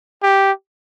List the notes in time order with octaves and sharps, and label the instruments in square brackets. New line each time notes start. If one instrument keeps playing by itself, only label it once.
[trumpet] G4